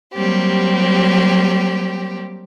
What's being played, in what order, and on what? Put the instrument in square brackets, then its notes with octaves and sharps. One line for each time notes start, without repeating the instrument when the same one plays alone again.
[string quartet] F#3 G3 A#3 C4 G4